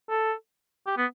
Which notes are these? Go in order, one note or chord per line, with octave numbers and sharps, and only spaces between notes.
A4
G4
B3